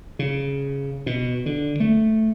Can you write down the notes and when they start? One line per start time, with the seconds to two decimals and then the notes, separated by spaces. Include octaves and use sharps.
0.19 C#3
1.06 B2
1.46 D3
1.80 A3